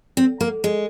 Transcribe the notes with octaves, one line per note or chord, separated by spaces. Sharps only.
C4
A#3
G#3